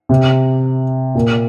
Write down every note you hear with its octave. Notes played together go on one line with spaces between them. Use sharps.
C3
A#2